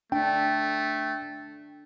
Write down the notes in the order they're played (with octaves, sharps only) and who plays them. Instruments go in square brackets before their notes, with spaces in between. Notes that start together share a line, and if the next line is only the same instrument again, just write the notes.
[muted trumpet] A3 [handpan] D4 [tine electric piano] G5